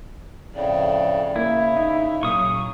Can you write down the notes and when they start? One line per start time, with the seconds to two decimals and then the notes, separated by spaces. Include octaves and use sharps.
0.55 F2 A2 C#3 D5
1.36 C#3 A#3 E4
1.76 D#4 E5
2.23 A#2 F#3 C#6 D#6